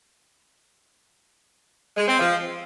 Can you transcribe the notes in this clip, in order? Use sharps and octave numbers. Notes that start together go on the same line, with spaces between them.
G#3
C4
F3